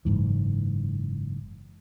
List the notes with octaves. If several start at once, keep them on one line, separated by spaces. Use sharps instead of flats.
F#1 C2 G#2 E3